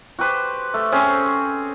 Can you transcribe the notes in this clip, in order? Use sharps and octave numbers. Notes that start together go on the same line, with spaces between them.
F#4 G4 B4 C5
A3
C4 C#4 G#4